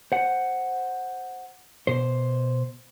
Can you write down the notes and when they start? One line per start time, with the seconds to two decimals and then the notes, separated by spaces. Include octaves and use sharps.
0.12 C5 F#5
1.87 B2 C5